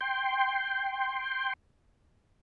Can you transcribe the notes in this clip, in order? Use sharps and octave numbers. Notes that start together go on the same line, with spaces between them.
G5 C6